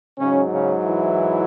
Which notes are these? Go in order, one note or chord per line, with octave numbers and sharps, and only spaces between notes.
G#2 C#3 F#3 C#4
C#3 C#4
E3 E4